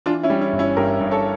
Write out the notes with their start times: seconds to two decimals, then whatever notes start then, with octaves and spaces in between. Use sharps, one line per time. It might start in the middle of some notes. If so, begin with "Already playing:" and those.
0.06 E3 D4 F4
0.23 C#4 E4
0.30 G3
0.41 C#4
0.52 G1
0.59 C#4 E4
0.77 G2 G4 A#4
1.00 G2
1.11 A4 C#5